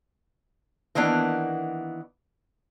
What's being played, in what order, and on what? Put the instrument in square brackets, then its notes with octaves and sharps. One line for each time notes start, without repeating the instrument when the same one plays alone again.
[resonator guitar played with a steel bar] D#3 E3 A#3 B3 D4